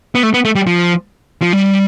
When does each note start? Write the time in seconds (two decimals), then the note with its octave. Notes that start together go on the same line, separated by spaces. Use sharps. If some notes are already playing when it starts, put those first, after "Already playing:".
0.15 B3
0.23 A3
0.34 B3
0.45 A3
0.55 G3
0.67 F3
1.42 F3
1.53 G3